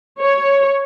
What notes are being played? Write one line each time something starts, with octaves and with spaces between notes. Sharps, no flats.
C#5